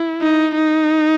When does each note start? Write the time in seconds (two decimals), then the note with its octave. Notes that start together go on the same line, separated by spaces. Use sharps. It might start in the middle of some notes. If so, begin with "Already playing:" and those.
Already playing: E4
0.22 D#4
0.55 D#4